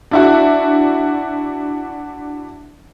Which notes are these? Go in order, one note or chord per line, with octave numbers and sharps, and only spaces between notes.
D4 E4 F#4